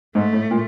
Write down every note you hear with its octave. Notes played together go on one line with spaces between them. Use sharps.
G#2 A3
A2
A#2